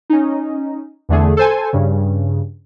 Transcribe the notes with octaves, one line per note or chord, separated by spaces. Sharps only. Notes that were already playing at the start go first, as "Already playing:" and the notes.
C#4 D#4
E2 D3 A3 G#4
A4 C5 G#5
G2 C#3